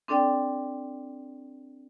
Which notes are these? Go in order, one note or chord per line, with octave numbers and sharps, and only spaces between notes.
C4 D4 A4 D5 G5